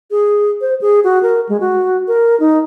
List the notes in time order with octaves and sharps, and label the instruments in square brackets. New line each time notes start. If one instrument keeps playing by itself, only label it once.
[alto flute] G#4
C5
G#4
F#4
A#4
G#3
F#4
A#4
D#4